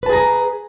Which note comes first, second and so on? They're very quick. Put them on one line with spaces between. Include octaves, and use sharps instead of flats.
B4 A5 G#4 A#5